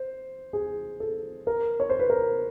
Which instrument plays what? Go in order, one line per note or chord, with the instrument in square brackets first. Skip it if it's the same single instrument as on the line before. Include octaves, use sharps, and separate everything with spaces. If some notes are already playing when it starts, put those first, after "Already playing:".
Already playing: [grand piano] C5
G#4
A4
A#4
C#5
C5
B4
A#4